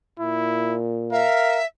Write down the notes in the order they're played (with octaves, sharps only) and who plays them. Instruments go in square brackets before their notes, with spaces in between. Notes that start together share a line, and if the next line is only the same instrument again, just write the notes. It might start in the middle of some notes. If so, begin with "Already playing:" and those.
[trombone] A#2 [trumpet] E4
[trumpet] A#4 [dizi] E5 [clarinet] F5